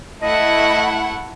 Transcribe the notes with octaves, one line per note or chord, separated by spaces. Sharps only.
A3 E4 D#5 F#5